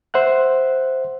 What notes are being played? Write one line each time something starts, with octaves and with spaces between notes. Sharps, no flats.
C5 E5 F#5 F#6